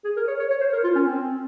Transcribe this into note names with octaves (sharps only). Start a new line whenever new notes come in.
G#4
A#4
C#5
C#5
C#5
C5
A#4
F4
C#4
C4